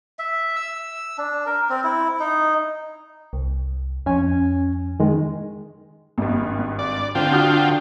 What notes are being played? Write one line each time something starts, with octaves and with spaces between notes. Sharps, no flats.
E5
E6
D4
A#4
C4
E4
D#4
C2
F2 C#4 G#5
D#3 G#3
G#1 G2
D5
D3 C4 F4 G5
F#4 D#6 F6